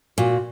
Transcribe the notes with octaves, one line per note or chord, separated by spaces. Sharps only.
A#2 F#4